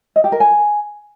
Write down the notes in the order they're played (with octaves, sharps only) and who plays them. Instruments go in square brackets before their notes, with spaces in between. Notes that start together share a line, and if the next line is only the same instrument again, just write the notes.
[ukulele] D#5
G4
A#4
G#5